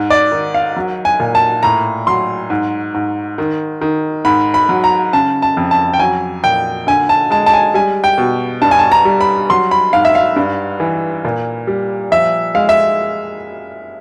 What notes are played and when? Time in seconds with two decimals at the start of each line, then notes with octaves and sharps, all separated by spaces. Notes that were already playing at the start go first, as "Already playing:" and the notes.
Already playing: G#2
0.10 D5
0.32 D#3
0.54 F5
0.77 F#3
1.05 G#5
1.20 A#2
1.35 A5
1.63 A2 A#5
2.07 F#3 C6
2.50 G#2
2.94 G#2
3.38 D#3
3.81 D#3
4.25 G#2 B5
4.54 B5
4.69 F#3
4.84 A#5
5.13 C#3 A5
5.42 A5
5.57 F2
5.71 A5
5.94 G5
5.99 F#3 G#5
6.44 A#2 G5
6.87 D3 G#5
7.09 A5
7.30 G#3 A5
7.46 A5
7.53 G#5
7.74 G3 G#5
8.04 G5
8.18 B2
8.61 G2 A5
8.71 G#5
8.79 A5
8.92 A#5
9.05 G3
9.21 B5
9.50 F#3 C6
9.71 B5
9.93 G#2 F5
10.05 E5
10.15 F5
10.36 G2
10.80 E3
11.25 A#2
11.67 G3
12.11 F3 E5
12.55 G#3 F5
12.69 E5